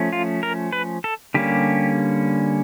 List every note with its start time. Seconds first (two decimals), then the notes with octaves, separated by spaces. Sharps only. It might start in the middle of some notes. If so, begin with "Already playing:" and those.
Already playing: F3 A3 C#4
0.13 F4
0.43 A#4
0.73 B4
1.04 A4
1.34 D3 G3 A#3 C#4 G4